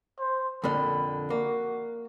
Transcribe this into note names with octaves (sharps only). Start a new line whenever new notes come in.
C5
F2 A#2 D3 B5
A#3 F#4